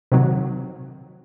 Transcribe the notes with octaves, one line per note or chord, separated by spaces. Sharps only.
C3 D#3 F#3